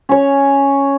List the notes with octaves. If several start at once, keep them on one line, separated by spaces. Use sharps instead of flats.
C#4 C#5